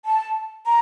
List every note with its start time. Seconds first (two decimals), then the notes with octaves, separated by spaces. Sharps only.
0.05 A5
0.66 A#5